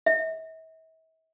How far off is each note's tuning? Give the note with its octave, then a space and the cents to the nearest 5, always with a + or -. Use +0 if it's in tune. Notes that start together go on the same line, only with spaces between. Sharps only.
E5 -40